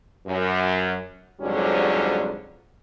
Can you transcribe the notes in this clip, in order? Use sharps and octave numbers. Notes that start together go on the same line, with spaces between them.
F#2
F2 G#2 D3 F#3 G3 C#4